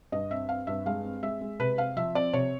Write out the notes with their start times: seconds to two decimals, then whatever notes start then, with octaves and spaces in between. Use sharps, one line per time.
0.12 G2 D#5
0.31 C4 E5
0.49 C4 F5
0.67 G2 E5
0.86 G#3 F5
1.04 C4
1.23 G#3 E5
1.41 G#3
1.60 C3 B4
1.78 C4 F5
1.96 F3 E5
2.15 C4 D5
2.33 C3 C#5